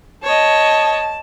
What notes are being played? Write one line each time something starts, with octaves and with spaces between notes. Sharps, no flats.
C#5 D#5 A5